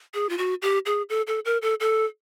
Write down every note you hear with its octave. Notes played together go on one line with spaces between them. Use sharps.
G#4
F4
F#4
G4
G#4
A4
A4
A#4
A4
A4